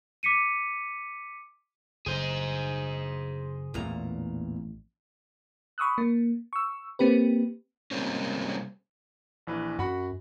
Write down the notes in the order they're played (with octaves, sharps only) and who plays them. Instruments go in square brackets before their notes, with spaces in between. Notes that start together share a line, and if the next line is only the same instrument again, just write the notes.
[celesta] D6 B6 C#7 D#7
[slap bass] F#1 [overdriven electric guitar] G#4 C5
[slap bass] A1 [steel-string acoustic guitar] E2 A#2 A#5
[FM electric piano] B5 C#6 D#6 E6 F#6
A#3
C#6 E6
A#3 C4 G4 B4
[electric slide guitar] C3 G3 G#3 A#3 C4 C#4
[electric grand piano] A#1 E3 B4
[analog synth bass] F#2 [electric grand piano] F#4 F#5 B5